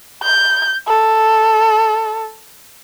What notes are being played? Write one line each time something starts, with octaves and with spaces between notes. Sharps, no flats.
G6
A4